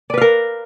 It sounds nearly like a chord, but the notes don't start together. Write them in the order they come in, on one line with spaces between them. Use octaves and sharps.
D5 B4 F5 A#4